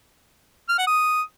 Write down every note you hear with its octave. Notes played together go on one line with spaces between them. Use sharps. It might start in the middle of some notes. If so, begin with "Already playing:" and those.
F6
F#5
D#6